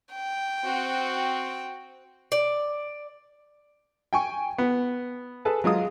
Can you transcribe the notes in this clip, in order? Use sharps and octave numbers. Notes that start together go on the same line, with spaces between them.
G5
C4 F#4
D5
G5 G#5 C#6
B3
G#4 A4 B4 A5
F#3 G#3 F4 D#6